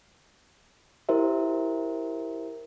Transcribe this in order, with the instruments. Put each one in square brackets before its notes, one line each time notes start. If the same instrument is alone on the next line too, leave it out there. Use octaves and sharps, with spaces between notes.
[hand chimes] E4 G4 A#4 C5 E5